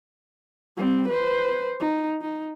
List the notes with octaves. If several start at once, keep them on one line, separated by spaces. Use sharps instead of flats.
G3 C4
B4 C5
D#4
D#4